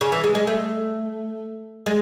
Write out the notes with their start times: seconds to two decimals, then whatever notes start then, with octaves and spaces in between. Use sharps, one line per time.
0.01 C#3
0.12 E3
0.24 G#3
0.35 G#3
0.47 A3
1.86 G#3